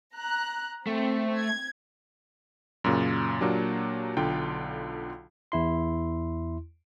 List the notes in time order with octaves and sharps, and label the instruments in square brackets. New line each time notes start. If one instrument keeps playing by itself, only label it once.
[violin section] A#5 F#6
[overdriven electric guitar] A3 [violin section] C4
[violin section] G#6
[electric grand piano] F#2 A#2 C#3
A#2 F#3 A#3 D4 G4
B1 D3 F4 G5
[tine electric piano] E2 E4 C6